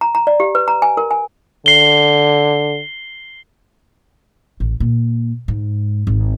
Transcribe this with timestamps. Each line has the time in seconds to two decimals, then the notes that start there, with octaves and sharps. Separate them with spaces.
0.01 A#5
0.15 A#5
0.27 D5
0.40 G4
0.55 B4
0.68 A#5
0.82 G#5
0.97 A#4
1.11 G#5
1.66 D3 C7 G7
4.60 A1
4.80 A#2
5.48 G#2
6.07 G#1